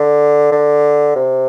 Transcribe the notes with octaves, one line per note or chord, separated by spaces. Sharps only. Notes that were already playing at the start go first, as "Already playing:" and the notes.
Already playing: D3
D3
C3